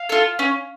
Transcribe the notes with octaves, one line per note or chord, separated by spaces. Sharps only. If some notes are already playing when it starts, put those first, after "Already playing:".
Already playing: F5
F4 A4
C#4